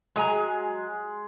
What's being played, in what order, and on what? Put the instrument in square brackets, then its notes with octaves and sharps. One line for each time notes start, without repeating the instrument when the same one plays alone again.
[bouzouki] F#3 G#5 A#5 [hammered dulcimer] G#3